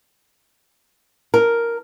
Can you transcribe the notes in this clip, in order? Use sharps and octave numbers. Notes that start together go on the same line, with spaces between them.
A#4